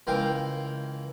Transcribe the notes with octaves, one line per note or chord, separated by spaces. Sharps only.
C#2 E3 A#4 F5 G5